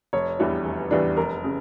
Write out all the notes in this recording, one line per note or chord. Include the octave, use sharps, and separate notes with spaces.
F1 C#5
E2 E3 G3 D4
F1
E2 E3 G3 D4
F1 A#4
C#3